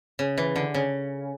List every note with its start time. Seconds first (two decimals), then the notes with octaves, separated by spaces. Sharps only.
0.19 C#3
0.38 E3
0.56 D3
0.74 C#3